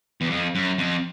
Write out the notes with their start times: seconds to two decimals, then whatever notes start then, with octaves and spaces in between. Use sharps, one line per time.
0.21 E2
0.30 F2
0.55 F#2
0.78 F2